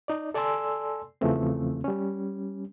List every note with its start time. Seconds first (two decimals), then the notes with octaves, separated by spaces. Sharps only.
0.08 D#4 D5
0.34 A4 D5 G#5 A5 C6 E6
1.21 E2 C#3 E3 F3 A3 C4
1.84 G3 C#4